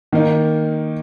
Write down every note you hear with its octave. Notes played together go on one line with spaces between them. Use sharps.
D#3 A#3 D#4